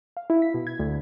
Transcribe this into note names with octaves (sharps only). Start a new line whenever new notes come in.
F5
E4
B6
B2
G#6
D2